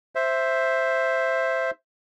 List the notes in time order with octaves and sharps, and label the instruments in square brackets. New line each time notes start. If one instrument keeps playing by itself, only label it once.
[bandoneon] C5 E5